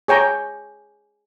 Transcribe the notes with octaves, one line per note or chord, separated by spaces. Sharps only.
G#4 C#5 G5 A#5